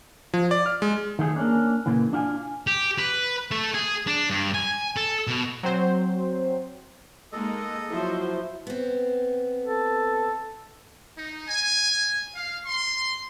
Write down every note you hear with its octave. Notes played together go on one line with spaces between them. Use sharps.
F3
D5
F6
G#3
D#3 A3 G#4
A#3 C#4 D4
A#2 C#3 E3
D4 F4 G5 G#5
G4
B4
A3
G#4
D4
G2
G#5
A4
B2
F#3 C4 C5
G#3 A#3 D#4 A4 D#5
F3 F#3 E4 C5
B3 C4
A4
D#4
G#5
F5
C6